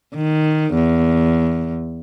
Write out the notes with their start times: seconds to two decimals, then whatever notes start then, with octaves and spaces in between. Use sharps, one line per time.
0.15 D#3
0.74 E2